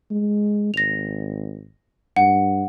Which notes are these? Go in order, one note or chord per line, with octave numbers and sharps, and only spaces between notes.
G#3
G#1 A#6 F7
G2 F#5